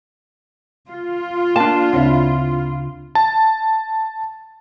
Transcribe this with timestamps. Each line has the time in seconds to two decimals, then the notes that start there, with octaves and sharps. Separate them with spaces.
0.89 F4
1.56 A#3 D4 A5
1.93 D2 C#3 C4 E4
3.15 A5